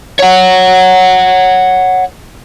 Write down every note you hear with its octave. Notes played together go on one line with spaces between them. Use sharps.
C#5 F#5